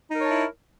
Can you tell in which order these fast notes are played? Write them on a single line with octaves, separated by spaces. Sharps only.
D#4 A#4 C#5 A5 E4